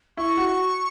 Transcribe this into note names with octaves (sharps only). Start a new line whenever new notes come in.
E4 C#6
F#4